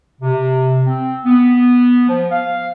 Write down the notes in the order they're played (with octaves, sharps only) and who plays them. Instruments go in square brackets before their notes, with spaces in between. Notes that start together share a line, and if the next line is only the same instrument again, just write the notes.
[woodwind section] C3
C4
B3
F3
F5